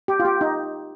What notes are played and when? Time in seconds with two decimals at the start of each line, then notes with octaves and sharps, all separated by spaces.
0.08 G4
0.20 F4
0.25 G4
0.41 D#4